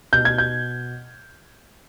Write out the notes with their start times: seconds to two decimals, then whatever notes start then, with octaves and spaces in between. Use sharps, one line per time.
0.13 B2 G6
0.25 G#6
0.38 G6